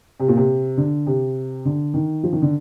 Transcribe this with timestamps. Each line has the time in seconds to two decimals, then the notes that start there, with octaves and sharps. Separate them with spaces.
0.20 C3
0.28 A#2
0.37 C3
0.77 D3
1.06 C3
1.65 D3
1.94 D#3
2.23 F3
2.33 D#3
2.42 D3